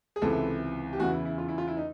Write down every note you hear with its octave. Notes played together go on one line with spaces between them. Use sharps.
G#4
C#2 C3 E3 A4
G4
E2 C#3 E3 F#4
E4
E4
F4
E4
F4
E4
D#4